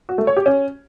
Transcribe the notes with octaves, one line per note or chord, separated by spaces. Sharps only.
F#4
A3
C#5
G4
C#4